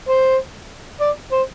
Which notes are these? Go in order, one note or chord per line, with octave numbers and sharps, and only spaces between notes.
C5
D5
C5